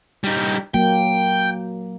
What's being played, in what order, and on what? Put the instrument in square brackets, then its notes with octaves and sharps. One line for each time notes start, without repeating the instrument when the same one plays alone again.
[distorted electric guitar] G3 D#4
[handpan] F#3 A#3 [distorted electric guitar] G5